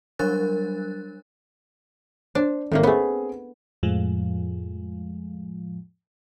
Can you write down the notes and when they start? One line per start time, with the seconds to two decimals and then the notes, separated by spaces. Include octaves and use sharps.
0.19 F#3 G3 D4 A#4 F#6 A6
2.35 D4 C5
2.72 G#1 A2 C3 A#3
2.83 A3 B3 C4 G#4
3.83 F2 A2 F3 G#3